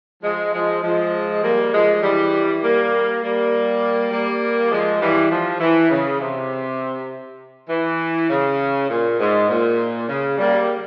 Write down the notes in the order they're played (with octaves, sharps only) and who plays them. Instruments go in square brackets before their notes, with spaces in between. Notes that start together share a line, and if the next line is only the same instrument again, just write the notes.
[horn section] F3 G#3
F3 G#3
F3 G#3
G3 A#3
F3 G#3
E3 G3
G3 A#3
G3 A#3
G3 A#3
F3 G#3
E3 G3
F3
E3
C#3
C3
E3
C#3
A#2
G#2
A#2
C#3
G3 A#3